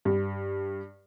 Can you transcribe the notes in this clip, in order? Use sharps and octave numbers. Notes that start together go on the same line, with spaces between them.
G2